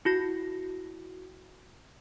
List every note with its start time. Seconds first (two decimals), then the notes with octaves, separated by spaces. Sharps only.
0.05 E4 F#4 A#6